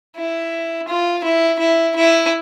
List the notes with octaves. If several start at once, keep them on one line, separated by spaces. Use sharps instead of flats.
E4
F4
E4
E4
E4